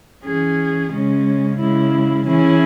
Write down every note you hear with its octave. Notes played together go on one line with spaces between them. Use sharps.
E3 C#4 G#4
C#3 G#3 C#4
C#3 G#3 E4
E3 C#4 E4 G#4